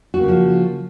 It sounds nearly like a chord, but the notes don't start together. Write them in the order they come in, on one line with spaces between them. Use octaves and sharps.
F#4 A#3 C#3 F3